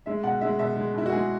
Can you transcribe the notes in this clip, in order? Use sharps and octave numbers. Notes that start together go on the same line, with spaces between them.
G#3 E5
B2 F#5
G#3 E5
B2 E5
G#3
B2 E4
F#4
G#3 G#4